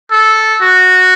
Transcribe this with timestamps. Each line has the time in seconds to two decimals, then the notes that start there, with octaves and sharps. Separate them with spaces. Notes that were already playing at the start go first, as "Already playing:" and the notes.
0.11 A4
0.61 F#4